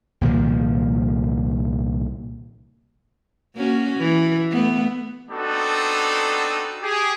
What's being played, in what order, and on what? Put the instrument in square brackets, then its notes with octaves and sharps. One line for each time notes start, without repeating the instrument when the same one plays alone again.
[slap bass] C2 A#2 D#3 F3
[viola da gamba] A#3 C#4 F#4
E3
A3 B3
[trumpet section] B3 C4 D4 D#4 F#4 A4
G4 G#4